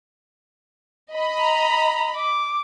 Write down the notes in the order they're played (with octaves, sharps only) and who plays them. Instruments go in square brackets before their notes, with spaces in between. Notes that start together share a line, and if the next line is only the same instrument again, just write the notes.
[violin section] D#5 B5
[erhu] A#5
D6